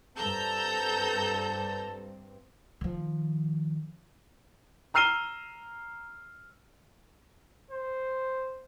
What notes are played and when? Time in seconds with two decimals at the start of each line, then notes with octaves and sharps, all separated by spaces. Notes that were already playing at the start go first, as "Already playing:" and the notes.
0.18 G2 C4 A4 A5 A#5 E6 G6
2.81 D#3 F3
4.94 A#5 E6 F6 C7 D#7 G7
7.71 C5